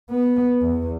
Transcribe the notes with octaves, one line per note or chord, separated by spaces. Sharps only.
B3
E2